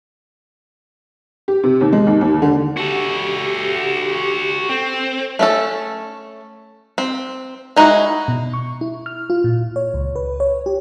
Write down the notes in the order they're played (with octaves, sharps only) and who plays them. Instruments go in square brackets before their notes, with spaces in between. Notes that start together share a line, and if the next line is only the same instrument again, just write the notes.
[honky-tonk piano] G4
C3
D#2
G#3
D#2
D#2
D3
[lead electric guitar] F#4 A4 [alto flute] G4
[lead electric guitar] C4 [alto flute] A4
[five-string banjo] A3 C#4 A4
C4
G#3 D#4 E4 F#4
[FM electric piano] B2
C#6
E4
F6
F4
A#2
C#5
C#2
B4
C#5
G4